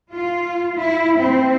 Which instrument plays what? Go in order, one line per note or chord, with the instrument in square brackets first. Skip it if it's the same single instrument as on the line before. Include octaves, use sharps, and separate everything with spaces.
[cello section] F4
E4
C4